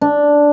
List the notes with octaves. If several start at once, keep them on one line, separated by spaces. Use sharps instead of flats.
D4